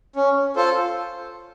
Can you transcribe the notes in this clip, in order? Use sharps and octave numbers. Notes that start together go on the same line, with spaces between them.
C#4
F4 A4 C5